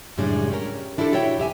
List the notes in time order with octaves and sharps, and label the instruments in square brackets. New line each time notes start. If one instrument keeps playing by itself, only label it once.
[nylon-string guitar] F#2 A2 C#3 G3 G#3 D4
C#4 G4 A#4
D4 E4 F4 G4 A4
A#2 E4 F#4 C#5 E5 G5
F2 G4 E5 G#5